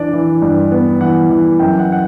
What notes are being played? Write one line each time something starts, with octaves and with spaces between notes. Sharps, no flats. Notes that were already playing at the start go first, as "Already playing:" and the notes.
Already playing: E3 D4 D5
E3
G2
B3
E3 F#5
E3
F#2 G5
F#5
F#5